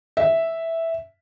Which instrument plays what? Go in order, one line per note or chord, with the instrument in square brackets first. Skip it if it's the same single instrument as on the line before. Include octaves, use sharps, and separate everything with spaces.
[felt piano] E5